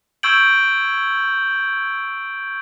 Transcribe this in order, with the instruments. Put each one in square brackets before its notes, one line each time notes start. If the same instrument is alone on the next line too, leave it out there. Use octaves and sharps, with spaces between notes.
[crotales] C#6 E6 G6 G#6 D7 F#7